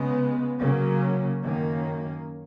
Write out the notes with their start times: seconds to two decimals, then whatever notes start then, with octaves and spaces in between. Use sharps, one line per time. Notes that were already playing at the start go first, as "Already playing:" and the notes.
Already playing: C#3 G#3 B3
0.60 C#3 F#3 A#3 C#4
1.43 F#2 D#3 A#3 C#4